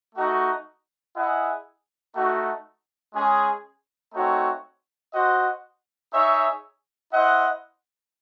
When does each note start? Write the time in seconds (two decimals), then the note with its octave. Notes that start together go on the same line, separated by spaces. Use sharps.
0.15 A3 D#4 F#4
1.15 E4 G#4 D#5 F#5
2.14 A3 D#4 F#4
3.14 G#3 C#4 G#4
4.14 A3 C4 D#4 F#4 C#5
5.13 F#4 C5 D#5 F#5
6.13 D#4 G#4 C#5 E5
7.13 E4 C5 D#5 F#5